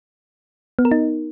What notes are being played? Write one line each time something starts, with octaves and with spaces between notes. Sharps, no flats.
B3
A#4
D#4